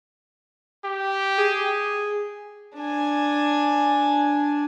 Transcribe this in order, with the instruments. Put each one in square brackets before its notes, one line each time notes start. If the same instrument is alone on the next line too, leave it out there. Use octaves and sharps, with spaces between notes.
[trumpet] G4
[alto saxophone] G#4
[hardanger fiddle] D4 G#5